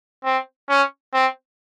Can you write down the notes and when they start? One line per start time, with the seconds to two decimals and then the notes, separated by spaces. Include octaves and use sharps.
0.24 C4
0.69 C#4
1.13 C4